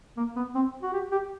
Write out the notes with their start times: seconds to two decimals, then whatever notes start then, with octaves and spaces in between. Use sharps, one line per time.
0.17 A#3
0.36 B3
0.55 C4
0.83 F#4
0.93 G4
1.12 G4